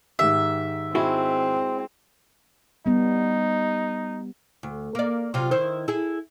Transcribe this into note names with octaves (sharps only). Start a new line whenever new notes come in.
G#2 D#3 G4 E5
G#3 C4 E4 F#4
G3 B3 D#4
D2
A#3 D5
C3 F#3 F4
D#3 E4 C5
E4 G#4